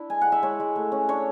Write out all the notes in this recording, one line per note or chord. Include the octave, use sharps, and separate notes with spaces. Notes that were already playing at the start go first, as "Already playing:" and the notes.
Already playing: D4 E4 B5
G#3 G#5
F#5
G#3
E5
G#3 C#5
G#3
A3
C#4
D4 C#5